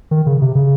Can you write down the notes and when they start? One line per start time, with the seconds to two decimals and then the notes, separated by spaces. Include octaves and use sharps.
0.11 D#3
0.26 C#3
0.42 C3
0.55 C#3